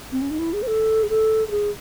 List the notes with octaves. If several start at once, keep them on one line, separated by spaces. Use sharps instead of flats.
C4
C#4
D#4
E4
G#4
C5
A4
G#4
A4
A4
G#4